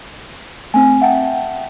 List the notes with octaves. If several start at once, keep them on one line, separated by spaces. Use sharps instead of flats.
A3 C4 G#5
E5 F#5 G5 A5